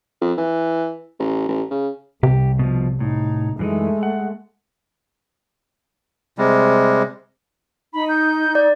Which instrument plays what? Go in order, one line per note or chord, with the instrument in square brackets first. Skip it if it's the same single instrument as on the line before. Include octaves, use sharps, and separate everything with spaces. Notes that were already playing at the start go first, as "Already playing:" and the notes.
[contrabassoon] F2
E3
A1
A1
C#3
[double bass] C2 [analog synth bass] C3 [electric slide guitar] G4
[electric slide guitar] B2 F3
[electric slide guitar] A2 [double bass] D#4
[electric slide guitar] F#2 E3 D#4 [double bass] G#3 A3
[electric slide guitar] F#5
[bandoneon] C3 G3 G#3
[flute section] D#4 [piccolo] B5
[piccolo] G6
[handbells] D5